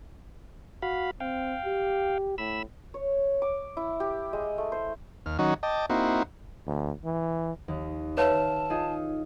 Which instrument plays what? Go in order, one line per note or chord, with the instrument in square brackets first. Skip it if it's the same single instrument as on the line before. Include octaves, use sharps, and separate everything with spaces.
[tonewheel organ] F#4 F5 B5
[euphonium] C4 [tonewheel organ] F5 G5
[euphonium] G4
[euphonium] A2 [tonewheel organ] B5 E6
[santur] C#5
D6
E4
G4
G#3
A3
C5
[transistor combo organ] D#2 F6
D#3 F#3 C#4 D#4 F#4
D#5 G5 A5 D6
A#3 C4 D#4 E4 F#4
[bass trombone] D2
E3
[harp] D#2
[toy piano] B4 C#5 F5 [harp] E5 C6 F6 [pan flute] A5
[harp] D#4 F4 G#4